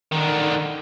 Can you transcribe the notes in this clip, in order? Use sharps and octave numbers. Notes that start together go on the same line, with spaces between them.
D3 D#3